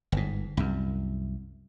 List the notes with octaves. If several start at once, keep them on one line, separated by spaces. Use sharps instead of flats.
G1 G#2
C2 F#2